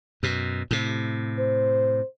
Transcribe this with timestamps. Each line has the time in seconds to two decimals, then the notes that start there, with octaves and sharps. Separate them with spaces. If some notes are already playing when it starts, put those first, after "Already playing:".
0.23 F#2 B2
0.71 A2 C3
1.39 C5